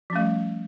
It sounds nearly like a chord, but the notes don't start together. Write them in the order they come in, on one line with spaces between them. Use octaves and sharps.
F3 C#4 A3 G3